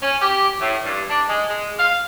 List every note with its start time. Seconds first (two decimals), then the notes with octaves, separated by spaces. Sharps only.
0.03 C#4
0.21 G4
0.61 A2
0.85 G2
1.10 D4
1.29 G#3
1.49 G#3
1.79 F5